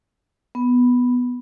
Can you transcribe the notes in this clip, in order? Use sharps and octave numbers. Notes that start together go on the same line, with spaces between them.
B3